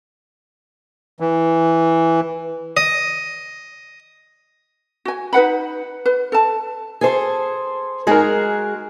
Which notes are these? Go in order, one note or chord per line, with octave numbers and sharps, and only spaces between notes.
E3
D#5
F#4 G#5
D#4 B4 F#5 B5
B4
A4 A5
G#4 A4 C5
G#3 D#4 F#4 G#4 A#4